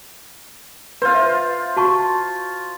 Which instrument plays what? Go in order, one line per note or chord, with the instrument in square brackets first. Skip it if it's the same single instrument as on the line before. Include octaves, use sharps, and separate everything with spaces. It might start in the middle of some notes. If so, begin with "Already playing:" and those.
[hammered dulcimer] F4 C5 [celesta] B4
[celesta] E5
F#4 A5 C#6